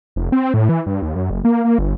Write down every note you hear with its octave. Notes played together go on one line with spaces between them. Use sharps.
F1
C4
A2
E3
G2
D#2
F#2
F#1
A#3
A#3
G1